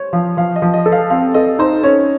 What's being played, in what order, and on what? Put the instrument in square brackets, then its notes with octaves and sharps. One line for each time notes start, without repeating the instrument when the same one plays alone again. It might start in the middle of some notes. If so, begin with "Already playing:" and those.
Already playing: [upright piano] C5 C#5
[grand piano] F3 [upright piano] F5
[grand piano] F3 [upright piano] F5
[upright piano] D#5
[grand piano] F3
[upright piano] D#5
[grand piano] A4
[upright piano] F5
[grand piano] C4 [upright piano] F5
[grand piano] A4 [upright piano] D#5
[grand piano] D#4 [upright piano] C5
[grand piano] C#4 [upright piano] C#5